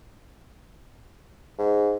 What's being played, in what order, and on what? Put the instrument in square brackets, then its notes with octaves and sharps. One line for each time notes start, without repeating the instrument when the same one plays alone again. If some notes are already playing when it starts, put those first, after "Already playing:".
[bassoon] G#2